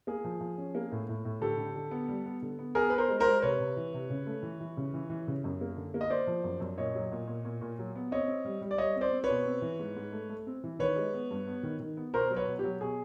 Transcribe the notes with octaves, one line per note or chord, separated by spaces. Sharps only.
A#3 G#4
F3
F3
C#4
A#3
A2
A2
A2
D3 G4 A4
D3
D3
B3
G3
B3
D3
B3
B3 G#4 A#4
B3 B4
A#4 C5
G#3
A#4 C5
G#3
C3 B4 C#5
C3
E3
C3
C#3
A3
E3
E3
C#3
E3
E3
C#3
F#2
A#3
D3
A#3
D#5
A#3 C5 D5
F3
F#2
F#2
A#2 C#5 D#5
F#3
A#2
A#2
A#2
A#2
F#3
B3
C4 C#5 D#5
C4
G3
G3
D5
G3 C#5 D#5
C4
C5 D5
C4
B4 C#5
B2
C4
E3
G#2
G#2
A3
A3
C4
E3
D#3 B4 C#5
G#3
B3
G2
B3
D#3
D#3
B3
B2 A#4 C5
F#3
B4 C#5
B2
F#3 G4
B2 G#4